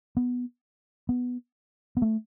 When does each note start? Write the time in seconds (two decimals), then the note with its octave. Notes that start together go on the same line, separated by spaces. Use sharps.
0.17 B3
1.09 B3
1.97 B3
2.02 A3